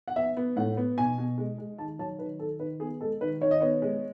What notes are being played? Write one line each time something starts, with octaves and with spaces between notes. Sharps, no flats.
F#5
B3 E5
B3
A2 F#5
B3
B2 G#5
B2
G#3
G#3
D#3 A5
F#3 A5
D#3 B4
D#3 A4
D#3 B4
B3 G#4
G#3 A4
D#3 B4
D#3 C#5
D#5
B3 C#5
G#3